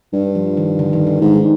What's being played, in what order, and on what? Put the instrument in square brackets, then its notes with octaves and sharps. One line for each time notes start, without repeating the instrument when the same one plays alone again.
[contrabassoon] G2
[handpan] F3
D#3
D3
D#3
D3
[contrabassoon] G#2 [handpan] D#3